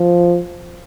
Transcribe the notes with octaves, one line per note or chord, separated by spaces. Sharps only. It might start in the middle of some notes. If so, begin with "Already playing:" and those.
Already playing: F3